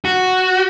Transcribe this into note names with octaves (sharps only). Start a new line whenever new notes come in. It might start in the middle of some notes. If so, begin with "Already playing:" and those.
F#4